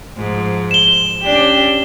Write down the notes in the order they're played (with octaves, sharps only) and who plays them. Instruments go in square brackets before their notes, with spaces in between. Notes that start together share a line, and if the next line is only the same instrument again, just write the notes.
[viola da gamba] G#2 F3
[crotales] E7 G7
[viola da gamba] C#4 D4 G4